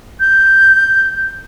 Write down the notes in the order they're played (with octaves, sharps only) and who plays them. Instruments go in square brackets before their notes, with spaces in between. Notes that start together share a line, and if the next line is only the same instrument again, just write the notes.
[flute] G6